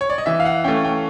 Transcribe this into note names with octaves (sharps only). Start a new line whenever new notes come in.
C#5
D5
D#5
E3 E5
F5
F#5
A3 C#4 G5
G5